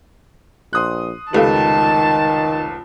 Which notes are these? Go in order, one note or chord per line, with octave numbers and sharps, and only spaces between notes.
A#1 C6 D#6 F#6
F1 C#2 D#3 G4 A4 B4 F5 A5